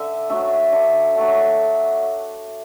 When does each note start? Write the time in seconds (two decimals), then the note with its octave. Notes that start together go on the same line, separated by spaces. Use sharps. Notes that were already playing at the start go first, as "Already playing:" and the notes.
Already playing: D3 E5
0.30 F#3 A3 D4 E5
0.72 D3 D5
1.16 F#3 A3 D4